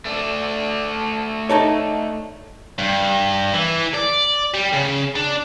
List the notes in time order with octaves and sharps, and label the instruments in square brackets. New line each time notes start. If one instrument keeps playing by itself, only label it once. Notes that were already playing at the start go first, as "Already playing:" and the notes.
[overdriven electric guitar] A3 D4
[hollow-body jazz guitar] D#4 A4 C#5
[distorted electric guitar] G2
E3
D5
G3
C#3
D4